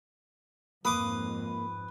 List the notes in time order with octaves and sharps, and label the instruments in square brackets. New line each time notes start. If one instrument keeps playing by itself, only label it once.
[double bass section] F2 G#2 [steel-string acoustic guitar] A#3 [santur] B4 [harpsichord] D6 D#6